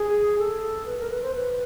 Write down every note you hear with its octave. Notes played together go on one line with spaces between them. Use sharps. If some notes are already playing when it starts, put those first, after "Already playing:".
Already playing: G#4
A4
B4
A#4
B4
C5
B4